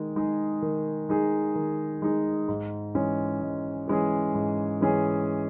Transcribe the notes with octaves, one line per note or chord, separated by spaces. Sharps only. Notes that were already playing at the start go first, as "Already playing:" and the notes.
Already playing: D#3 G#3 D#4
G#3 D#4 G#4
D#3
G#3 D#4 G#4
D#3
G#3 D#4 G#4
G#2
E3 G#3 C#4 G#4
G#2
E3 G#3 C#4 G#4
G#2
E3 G#3 C#4 G#4